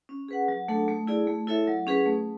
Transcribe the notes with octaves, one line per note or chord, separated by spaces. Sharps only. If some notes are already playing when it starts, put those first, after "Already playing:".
C#4
G#4 B4 F#5
F#3
A3 D4 A4
A3
E4 G#4 D5
A3
E4 A4 C#5 E5
F#3
C#4 G#4 B4
A3